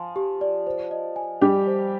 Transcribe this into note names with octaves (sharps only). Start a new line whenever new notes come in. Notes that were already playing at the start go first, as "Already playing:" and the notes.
Already playing: F3 G#5 C6
G4
D5
C5
D#5
G#5
G3 G4 D6
C5